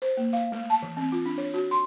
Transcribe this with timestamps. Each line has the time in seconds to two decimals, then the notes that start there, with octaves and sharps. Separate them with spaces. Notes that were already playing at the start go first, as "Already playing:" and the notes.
0.02 C5
0.17 A#3
0.33 F5
0.52 A3
0.70 A5
0.82 E3
0.97 C4
1.12 F4
1.26 D4
1.38 C#5
1.54 F#4
1.71 C6